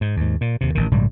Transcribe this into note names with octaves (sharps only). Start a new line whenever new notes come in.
G#2
D#2 G#2
A#2
D#2 C3
A1 D#3
A#1 G#2 C#3 G3